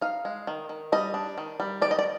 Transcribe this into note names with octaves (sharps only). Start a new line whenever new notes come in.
D#4 F5
G#3
D#3
D#3
G3 D#5
D4
D#3
G3
D#3 D5
D#5
D5